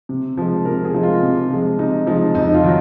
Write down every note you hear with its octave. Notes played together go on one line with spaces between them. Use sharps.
C3
F3 G#3
C3 A#4
G#4
F3 G#3 D#4
F4
C3
F3 G#3
C3 D#4
F3 G#3 D#4
F2 D#4
D#4
F4
D#3 F#3